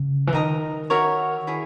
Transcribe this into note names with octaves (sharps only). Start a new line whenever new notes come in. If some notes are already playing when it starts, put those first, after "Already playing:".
Already playing: C#3
E3
D#3 A#4 D#5 A#5 D#6
F#4 A#4 C#5 E5
E4 G#4 C#5